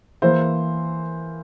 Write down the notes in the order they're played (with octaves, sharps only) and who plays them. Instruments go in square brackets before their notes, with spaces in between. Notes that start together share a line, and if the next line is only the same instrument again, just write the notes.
[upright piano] E3 A#3 E4 C5